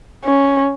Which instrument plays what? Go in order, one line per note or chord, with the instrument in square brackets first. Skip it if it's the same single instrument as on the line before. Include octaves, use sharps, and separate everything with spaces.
[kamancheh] C#4